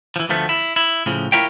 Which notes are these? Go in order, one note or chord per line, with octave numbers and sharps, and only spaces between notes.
E3 F3
D2 F3 A3 B3
E4
E4
A2 C#3 F3
E4 F4 A#4 C#5 E5 G5